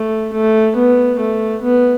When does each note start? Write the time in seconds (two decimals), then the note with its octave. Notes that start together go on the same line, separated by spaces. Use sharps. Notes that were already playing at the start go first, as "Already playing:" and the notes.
Already playing: A3
0.33 A3
0.76 B3
1.20 A3
1.63 B3